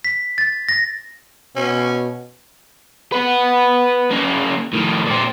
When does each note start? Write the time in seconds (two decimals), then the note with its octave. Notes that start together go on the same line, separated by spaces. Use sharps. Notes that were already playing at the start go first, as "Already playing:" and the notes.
0.04 B6
0.38 A6
0.69 A#6
1.56 B2 C#4
3.12 B4 F#5
4.11 C#3 A#3
4.73 A2 D#3
5.06 A#2 C4